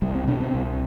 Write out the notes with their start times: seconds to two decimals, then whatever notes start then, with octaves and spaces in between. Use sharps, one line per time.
0.02 C2 G3
0.15 C4
0.27 B2 D4
0.40 C4
0.54 C2